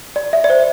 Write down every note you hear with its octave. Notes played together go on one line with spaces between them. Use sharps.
D5
E5
D5
C5